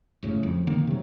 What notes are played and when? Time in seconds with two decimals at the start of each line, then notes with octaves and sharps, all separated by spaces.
0.23 F#1 A2 C#3
0.43 F2
0.67 D3 D#3 A#3
0.87 C3 F#3